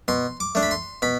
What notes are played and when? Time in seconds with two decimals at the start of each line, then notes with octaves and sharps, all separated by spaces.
0.08 B2 C6
0.40 D6
0.55 A3 D4
0.63 B5
0.71 C6
1.02 B2 B5